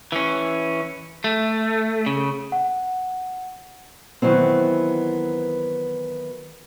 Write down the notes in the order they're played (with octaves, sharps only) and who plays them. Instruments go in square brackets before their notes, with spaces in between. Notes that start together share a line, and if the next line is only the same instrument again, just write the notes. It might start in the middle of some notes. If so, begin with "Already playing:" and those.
[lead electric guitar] E3 C#4
A3
C#3
[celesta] F#5
[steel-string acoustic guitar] D#3 E3 F#3 B3 C4